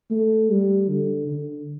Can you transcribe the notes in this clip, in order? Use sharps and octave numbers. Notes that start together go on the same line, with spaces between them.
A3
G3
D3
D3